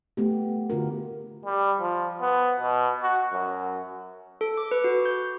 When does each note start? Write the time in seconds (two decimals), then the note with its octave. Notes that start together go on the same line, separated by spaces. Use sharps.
0.17 A3 B3 G4
0.70 D3 F4 F#4 A#4
1.45 G3
1.80 F3
2.21 B3
2.60 B2
3.03 F#4
3.33 F#2
4.41 A4
4.57 D6
4.71 B4
4.84 F#4
5.05 G6